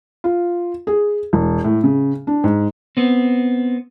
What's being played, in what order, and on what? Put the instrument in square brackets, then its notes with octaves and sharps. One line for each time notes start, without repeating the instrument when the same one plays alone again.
[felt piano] F4
G#4
E1
A2
C#3
D4
G#2
[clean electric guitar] B3 C4